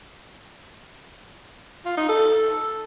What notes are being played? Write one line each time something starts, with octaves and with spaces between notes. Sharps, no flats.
F4
D#4
A4